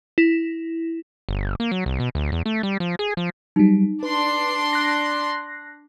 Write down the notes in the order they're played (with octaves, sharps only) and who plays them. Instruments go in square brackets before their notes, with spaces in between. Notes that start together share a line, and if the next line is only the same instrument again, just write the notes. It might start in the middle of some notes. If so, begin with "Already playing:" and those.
[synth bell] E4
[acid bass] G1
A#3
F#3
C2
B2
D2
E2
A3
G3
F3
G#4
F3
[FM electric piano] F#3 G3 [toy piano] D#4
[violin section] D4 C6 [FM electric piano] B4
[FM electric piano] F#6 A#6 C7